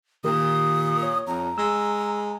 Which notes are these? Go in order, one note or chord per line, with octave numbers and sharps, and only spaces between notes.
A#2 D#3 G4 A#4 D#6
C#5
F2 A#5
G#3 E6